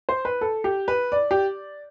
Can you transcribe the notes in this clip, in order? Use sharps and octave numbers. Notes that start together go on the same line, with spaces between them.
C5
B4
A4
G4
B4
D5
G4